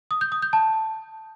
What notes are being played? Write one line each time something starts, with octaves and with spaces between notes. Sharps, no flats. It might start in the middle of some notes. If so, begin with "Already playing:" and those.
D#6
G6
D#6
G6
A5